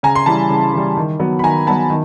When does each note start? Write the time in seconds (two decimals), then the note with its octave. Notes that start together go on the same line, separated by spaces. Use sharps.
0.03 C#3 G#5 A#5
0.15 C6
0.26 E3 G3 A5 B5
0.50 C#3
0.74 E3 G3
0.97 D#3
1.20 F#3 B3
1.39 B5
1.43 D#3 G#5 A#5
1.66 F#3 B3 A5 B5
1.90 D#3